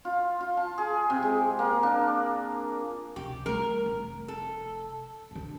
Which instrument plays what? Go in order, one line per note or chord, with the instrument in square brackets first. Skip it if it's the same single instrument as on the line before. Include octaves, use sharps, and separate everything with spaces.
[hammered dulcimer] F4
F4
A5
G#4
C3
G#3
A#3
D4
[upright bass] C#2 C3 [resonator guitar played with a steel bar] G4
[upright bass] G3 A3 [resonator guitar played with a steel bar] A#4
[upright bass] F1
[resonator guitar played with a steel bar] A4
[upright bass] G2 D3